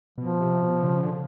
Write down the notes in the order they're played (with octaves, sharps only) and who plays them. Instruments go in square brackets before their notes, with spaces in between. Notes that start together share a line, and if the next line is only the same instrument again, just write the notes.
[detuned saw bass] B2 [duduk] F3
[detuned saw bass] C3
B2
D3
C#3
D3